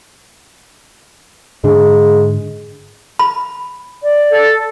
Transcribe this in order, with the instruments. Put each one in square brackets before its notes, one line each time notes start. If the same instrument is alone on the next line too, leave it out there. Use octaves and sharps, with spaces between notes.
[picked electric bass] G#2 D3 D4 [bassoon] G#3
[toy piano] B5
[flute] D5
[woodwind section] A4